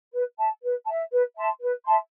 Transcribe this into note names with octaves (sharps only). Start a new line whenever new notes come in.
B4
E5 A5
B4
A5
E5
B4
E5 A5 C6
B4
E5 A5 C6